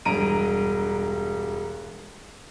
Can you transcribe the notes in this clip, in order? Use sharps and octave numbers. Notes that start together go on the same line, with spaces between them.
E1 G2 A#5 D7 D#7